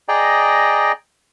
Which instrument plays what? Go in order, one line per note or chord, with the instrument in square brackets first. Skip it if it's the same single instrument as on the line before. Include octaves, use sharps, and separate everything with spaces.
[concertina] G#4 D5 D#5 G5 A#5